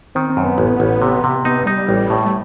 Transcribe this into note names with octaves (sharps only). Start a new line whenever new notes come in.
D#3 C4
C4
F#2
B3
A1
A1
C3
C3
B3 D#4
G3 D#4
A1
A2
A3